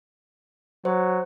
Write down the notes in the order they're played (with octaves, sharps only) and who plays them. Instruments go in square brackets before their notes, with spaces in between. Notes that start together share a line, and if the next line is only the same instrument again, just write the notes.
[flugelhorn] F#3 [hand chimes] C5